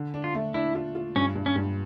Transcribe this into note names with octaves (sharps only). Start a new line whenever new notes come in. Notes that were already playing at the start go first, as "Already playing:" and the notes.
Already playing: D3
D4
F4
A3
D4 E4
F4
F4
G2 C#4
G2
C#4
G2